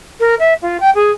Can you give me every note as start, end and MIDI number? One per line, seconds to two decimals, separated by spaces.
0.20 0.35 70
0.39 0.54 76
0.62 0.78 65
0.80 0.90 79
0.95 1.11 68